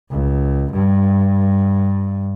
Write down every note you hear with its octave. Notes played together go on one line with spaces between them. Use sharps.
C#2
G2